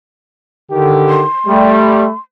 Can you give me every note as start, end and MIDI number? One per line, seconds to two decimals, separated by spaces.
0.71 1.24 50
0.71 1.23 51
0.71 1.23 67
1.09 2.19 84
1.47 2.04 55
1.47 2.12 57